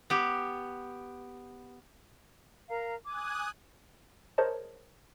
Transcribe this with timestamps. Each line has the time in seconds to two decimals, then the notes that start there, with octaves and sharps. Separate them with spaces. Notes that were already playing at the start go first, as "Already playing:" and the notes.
0.10 B3 G4
2.70 A#4 F5 A#5
3.05 G#5 D6 D#6 F#6
4.38 G#4 A#4 C5 C#5 D#5 A5